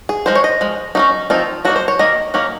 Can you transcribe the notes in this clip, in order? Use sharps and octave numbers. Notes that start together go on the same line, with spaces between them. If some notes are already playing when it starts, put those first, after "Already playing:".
G#4
F3 G#3 D#4 C5
C#5
D#5
F3 G#3
F#3 A#3 C#4 D#4
F3 C4 D#4 F4
F#3 A#3 D#4 F#4
C5
C#5
D#3 A#3 D#5
D#3 F#3 A#3 C#4